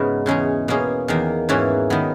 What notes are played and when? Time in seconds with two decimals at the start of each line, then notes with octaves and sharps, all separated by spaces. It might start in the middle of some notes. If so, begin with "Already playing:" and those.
Already playing: G#2 C#3 G#3 B3 E4 F#4 G#4 A#4
0.26 E2 C#3 G#3 C#4 G#4
0.68 B2 A#3 C#4 G#4
1.08 E2 D#3 A#3
1.49 G#2 E3 A#3 C#4 F#4
1.90 D#3 F#3 B3